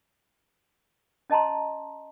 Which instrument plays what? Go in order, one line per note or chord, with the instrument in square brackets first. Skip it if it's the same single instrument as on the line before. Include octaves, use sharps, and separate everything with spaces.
[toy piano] C#4 D#5 A5 A#5 C6